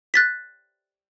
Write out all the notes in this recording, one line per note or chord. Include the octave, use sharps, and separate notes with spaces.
F#6 A6 B6